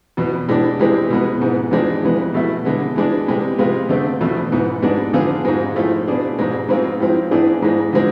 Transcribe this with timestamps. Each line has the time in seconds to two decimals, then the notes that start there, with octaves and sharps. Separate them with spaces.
0.17 E2 B2 B3
0.48 A2 G#3 D4
0.79 C3 E3 G#3 C4
1.10 B2 G#3 B3
1.41 G#2 E3 B3
1.71 E2 C3 F3 G#3 D4
2.03 F2 E3 G#3 B3
2.34 B2 A3 E4
2.65 D3 G#3 B3
2.96 E3 G#3 D4
3.27 C3 G#3 B3
3.58 C3 G#3 B3 F4
3.89 D3 A3 C4
4.21 E2 B2 A3
4.52 G#2 E3 B3
4.82 G#2 G#3 B3 D4
5.13 D3 F3 B3 F4 G#4
5.45 G#2 F3 G#3
5.76 A2 F3 A3
6.07 B2 B3 D4 G#4
6.38 G#2 G#3 C4
6.68 G#2 G#3 C4 F4
7.00 A2 F3 G#3 C4
7.31 A2 E3 B3 D4 G#4
7.62 G#2 E3 G#3
7.93 D3 F3 G#3 C4